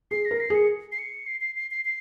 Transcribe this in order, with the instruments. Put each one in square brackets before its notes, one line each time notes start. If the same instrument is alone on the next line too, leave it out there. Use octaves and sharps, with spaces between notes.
[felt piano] G#4 [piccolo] C7
[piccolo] A#6
[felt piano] A#4
[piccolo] C7
[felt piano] G#4 [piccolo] C#7
[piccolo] C7
C#7
C7
C7
C7
C7
C7